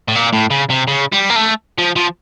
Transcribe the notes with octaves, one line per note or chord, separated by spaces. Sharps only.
A2
A#2
A2
C#3
C3
C#3
G3
A#3
A3
F3
F3